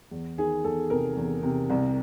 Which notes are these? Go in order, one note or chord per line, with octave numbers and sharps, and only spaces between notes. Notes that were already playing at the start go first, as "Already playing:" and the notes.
E2
D#3 G#4
E2 A4
C3 A#4
E2
C3
C2